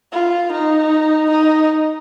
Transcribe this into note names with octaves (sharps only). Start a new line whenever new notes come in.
F4
D#4
D#4